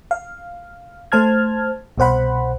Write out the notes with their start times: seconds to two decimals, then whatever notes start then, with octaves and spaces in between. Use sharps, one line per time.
0.11 F5
1.12 A3 C5 A5 F6 G#6
1.98 C2 B2 C5 F#5 B5